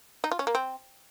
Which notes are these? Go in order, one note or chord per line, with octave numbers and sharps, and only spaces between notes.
D#4
F4
C#4
A#3
C4